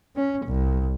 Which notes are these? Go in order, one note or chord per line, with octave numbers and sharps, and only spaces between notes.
C#4
C2